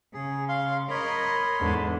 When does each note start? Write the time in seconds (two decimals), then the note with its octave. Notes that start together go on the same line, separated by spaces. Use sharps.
0.14 C#3 G#4
0.49 F5 C6
0.90 A#4 C#5 D#5 B5 C6
1.60 E2 G#2 D3